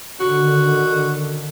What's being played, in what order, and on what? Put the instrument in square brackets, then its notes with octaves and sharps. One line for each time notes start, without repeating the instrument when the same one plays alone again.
[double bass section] D3 D#3 [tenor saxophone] F#4